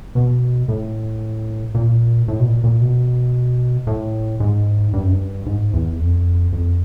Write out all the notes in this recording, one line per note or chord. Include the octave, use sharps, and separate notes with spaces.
B2
A2
A#2
A2
B2
A#2
A#2
B2
A2
G#2
G2
F#2
G2
G#2
E2
F2
F2